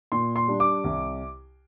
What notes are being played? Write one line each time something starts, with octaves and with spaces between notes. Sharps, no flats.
A#2 C6
C6
G3 D4
D6
C2